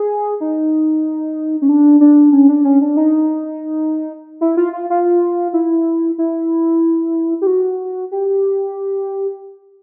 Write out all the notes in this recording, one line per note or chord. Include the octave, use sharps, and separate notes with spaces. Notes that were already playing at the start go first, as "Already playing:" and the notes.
Already playing: G#4
D#4
C#4
D4
D4
C#4
D4
C#4
D4
D#4
E4
F4
F4
F4
E4
E4
G4
F#4
G4